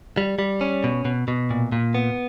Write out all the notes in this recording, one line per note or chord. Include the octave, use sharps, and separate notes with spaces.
G3
G3
C#4
B2
B2
B2
A#2
A#2
B3